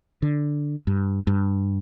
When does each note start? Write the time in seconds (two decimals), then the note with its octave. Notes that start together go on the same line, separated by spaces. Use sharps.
0.22 D3
0.87 G2
1.27 G2